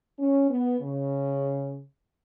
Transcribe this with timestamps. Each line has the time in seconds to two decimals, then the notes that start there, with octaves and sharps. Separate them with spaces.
0.18 C#4
0.49 B3
0.80 C#3